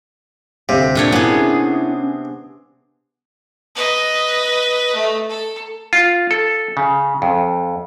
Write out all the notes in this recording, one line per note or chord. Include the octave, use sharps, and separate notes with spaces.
D2 C3 F5
A#2 D4 C#5
B3 C#4 E4 G#4
B4 D#5
A3
A4
F4
A4
C#3
F2